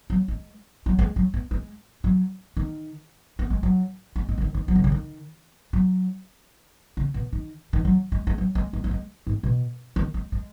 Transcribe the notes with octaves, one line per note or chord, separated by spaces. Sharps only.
F#3
G#3
F#3
G#3
F#3
B3
G#3
F#3
D#3
B3
G#3
F#3
G#3
G#3
C#3
D#3
D#3
F#3
D#3
C#3
D#3
F#3
C#3
B2
D#3
D#3
F#3
G#3
G#3
F#3
G#3
G#3
B3
G#3
G#2
B2
D#3
G#3
G#3